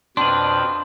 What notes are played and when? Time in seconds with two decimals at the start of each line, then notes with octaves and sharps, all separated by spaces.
0.17 F2 B2 D4 B4 G5 C6